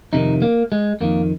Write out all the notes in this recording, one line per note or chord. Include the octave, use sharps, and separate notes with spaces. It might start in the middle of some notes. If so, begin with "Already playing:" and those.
F2 C3 D#3 D#4
A#3
G#3
F2 D#3 A#3